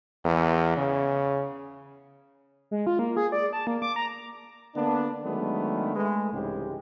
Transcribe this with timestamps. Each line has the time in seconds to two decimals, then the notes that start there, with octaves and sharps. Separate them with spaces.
0.25 E2
0.77 C#3
2.71 G#3
2.87 F4
2.99 A#3
3.17 G#4
3.32 D5
3.53 A5
3.67 A#3
3.82 D6
3.96 A#5
4.75 D3 A#3 B3 D4
5.24 D#3 F#3 G#3 A3 B3 D4
5.96 G#3 A3 B4
6.32 C2 G#2 C#3 E3 G#3 G4